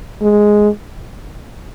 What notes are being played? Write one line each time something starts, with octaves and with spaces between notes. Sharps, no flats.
G#3